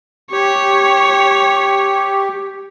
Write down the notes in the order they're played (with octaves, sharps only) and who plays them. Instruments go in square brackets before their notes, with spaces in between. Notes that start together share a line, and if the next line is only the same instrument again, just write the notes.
[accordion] G4 [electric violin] C#5